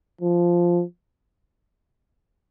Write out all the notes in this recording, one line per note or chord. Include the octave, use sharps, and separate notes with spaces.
F3